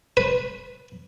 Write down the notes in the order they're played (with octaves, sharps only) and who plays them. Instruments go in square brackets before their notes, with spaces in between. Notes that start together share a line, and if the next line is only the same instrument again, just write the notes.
[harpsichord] B4